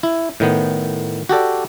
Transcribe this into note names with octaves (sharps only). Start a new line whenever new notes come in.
E4
A2 D#3 B3
F#4 G4 A4 D5